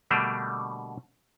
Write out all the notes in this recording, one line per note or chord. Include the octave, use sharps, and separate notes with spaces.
B2 D3 G3 A3 A#3 D4